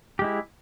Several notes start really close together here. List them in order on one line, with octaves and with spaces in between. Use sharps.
G4 G#3 E4